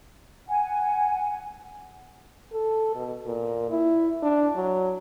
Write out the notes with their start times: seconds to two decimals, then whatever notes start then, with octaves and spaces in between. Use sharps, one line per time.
0.48 F#5 G#5
2.53 A4
2.95 B2
3.26 A#2
3.71 E4
4.22 D4
4.55 F#3